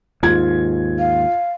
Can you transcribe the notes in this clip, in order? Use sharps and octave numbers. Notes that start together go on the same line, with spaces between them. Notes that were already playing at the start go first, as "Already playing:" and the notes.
D#2 G#2 F4 G#6
F5